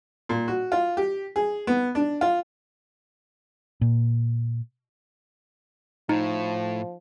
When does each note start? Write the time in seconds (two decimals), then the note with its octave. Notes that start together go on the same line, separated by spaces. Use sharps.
0.29 A#2
0.48 F#4
0.72 F4
0.97 G4
1.36 G#4
1.67 B3
1.95 D4
2.21 F4
3.81 A#2
6.09 A2 F3 D#4